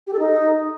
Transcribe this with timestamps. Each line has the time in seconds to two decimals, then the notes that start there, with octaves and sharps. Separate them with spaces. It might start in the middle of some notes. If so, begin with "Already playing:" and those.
0.07 G4
0.13 A4
0.19 D#4